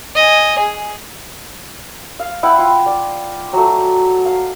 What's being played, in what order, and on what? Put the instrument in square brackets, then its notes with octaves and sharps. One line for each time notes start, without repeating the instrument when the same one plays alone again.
[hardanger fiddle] D#5 G#5
G#4
[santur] F5
E4 F#5 G5
F4
D5
F#3 A3
F5